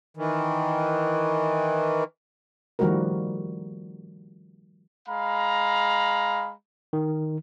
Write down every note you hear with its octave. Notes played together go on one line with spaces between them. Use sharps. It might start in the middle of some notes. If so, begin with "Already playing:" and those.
D#3 E3
D#3 F3 G3 A3 F#4 A#4
G#3 F5 A#5 B5
D#3